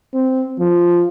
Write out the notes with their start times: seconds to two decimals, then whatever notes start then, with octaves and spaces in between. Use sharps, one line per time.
0.14 C4
0.59 F3